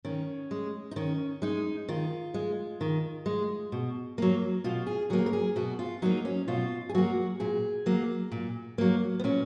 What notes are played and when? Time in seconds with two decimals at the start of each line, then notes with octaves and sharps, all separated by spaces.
0.05 D#3 C#4
0.51 G#3
0.91 D#4
0.96 D#3 C#4
1.42 G#3 D#4
1.89 D#3 F4
2.34 G#3
2.81 D#3
3.26 G#3
3.72 B2
4.18 F#3 A#3
4.64 B2 F4
4.87 G#4
5.10 F#3 A#3 G#4
5.26 A#4
5.33 G#4
5.56 B2 F#4
5.79 F4
6.02 F#3 A#3 D#4
6.25 C#4
6.48 B2 F4
6.89 G#4
6.94 F#3 A#3 F#4
7.40 A#2 G#4
7.86 F#3 A#3
8.32 A#2
8.78 F#3 A#3
9.19 B3
9.24 A#2 C#4